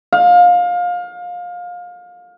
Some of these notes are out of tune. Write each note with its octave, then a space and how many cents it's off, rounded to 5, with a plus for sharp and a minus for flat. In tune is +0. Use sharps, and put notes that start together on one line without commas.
F5 +25